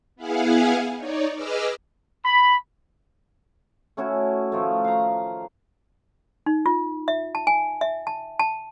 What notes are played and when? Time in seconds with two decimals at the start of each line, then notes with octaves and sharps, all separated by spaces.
0.16 B3 E4 G#4 F5 F#5 G#5
0.95 D#4 C#5 D5
1.35 G#4 B4 D#5 D6 E6 F6
2.25 B5
3.97 A3 C#4 E4 F#4
4.52 D#3 F3 A3
4.84 F5 A#5
6.46 D#4
6.66 F4
7.08 E5
7.35 A5
7.47 G#5
7.81 E5
8.07 A5
8.40 A5